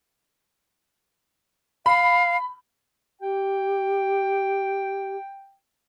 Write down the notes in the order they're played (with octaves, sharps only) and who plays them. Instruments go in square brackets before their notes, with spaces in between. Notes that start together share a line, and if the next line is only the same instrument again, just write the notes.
[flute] F5 [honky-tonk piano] B5
[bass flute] G4 [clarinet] G5